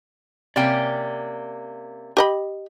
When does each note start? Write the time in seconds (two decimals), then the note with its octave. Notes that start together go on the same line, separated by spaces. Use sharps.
0.56 C3 A#3 C#4 D5 G5
2.17 G4 D#5 B5